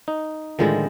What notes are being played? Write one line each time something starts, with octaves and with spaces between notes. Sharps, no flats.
D#4
A2 D3 D#3 F3 G#3 E4